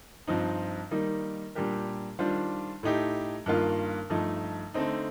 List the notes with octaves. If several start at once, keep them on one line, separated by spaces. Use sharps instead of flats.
G2 F3 C4 D#4
D#3 G3 A#3 D#4
A#2 G3 D4 G4 A#4
D#3 G3 D4 F4 C5
A2 A3 D#4 G4
G2 D#3 A#3 F4
G2 F3 A3 D#4
D3 A3 C4 D#4